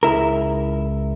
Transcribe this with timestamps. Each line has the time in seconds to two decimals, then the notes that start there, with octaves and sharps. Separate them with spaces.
0.03 C#2 E4 A#4